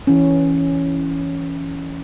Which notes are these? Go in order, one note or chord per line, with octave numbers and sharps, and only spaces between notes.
E3 C#4